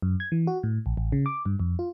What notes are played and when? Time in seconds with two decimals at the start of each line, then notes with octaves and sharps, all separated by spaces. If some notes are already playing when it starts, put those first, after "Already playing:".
0.02 F#2
0.20 G#6
0.32 E3
0.47 F#4
0.63 A2
0.86 A#1
0.97 A1
1.12 C#3
1.26 D6
1.46 G2
1.60 F2
1.79 F4